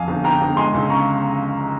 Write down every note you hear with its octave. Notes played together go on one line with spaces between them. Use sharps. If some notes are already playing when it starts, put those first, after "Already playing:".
Already playing: F2 F5 G#5
G1
G1 G5 A#5
G1
G#3 G#5 C6
C#2
C#3 A#5 C#6